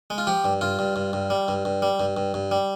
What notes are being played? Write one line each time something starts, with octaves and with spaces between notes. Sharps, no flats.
G#3
F4
F3 G4
G2
G2 F4
G2
G2
G2
G3
G2
G2
G3
G2
G2
G2
G3